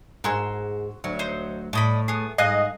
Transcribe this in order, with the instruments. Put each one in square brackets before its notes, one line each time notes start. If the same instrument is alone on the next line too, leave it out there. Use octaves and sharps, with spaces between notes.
[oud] G#2 G#4 A#4 [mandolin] F#4 C6 E6
[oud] D2 F#3
[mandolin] D#4 C5
[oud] A2 [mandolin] D5 D#5 B5
[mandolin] B3 G#4
[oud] G#2 [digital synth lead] D#5 [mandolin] F5 G#5 F#6